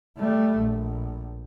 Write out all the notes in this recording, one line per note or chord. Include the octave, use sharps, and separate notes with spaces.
G3 A3
A#1